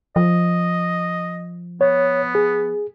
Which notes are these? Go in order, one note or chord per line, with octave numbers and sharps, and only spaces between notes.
F3 D#5
B3 C#5
G#4